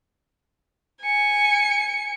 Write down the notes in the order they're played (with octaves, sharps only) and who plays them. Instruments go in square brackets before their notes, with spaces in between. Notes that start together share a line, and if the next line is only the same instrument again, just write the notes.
[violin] G#5 C#7